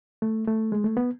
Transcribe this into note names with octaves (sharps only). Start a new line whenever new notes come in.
A3
A3
G#3
A3
B3